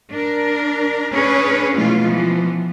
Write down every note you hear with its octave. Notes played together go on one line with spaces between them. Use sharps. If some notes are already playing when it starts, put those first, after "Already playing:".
D4 A#4
C#4 D4 G#4 B4 C#5
B2 E3 F#3 G#3 A3 F4
E3 F3 B3